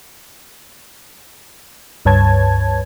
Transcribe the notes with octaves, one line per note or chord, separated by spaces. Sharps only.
C#2 G2 B4 C#5 A5 G#6